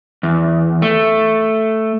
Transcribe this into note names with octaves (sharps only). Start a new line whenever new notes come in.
E2
A3